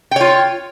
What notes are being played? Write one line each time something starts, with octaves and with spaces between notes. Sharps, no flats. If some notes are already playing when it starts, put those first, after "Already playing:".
F4 C#5 G5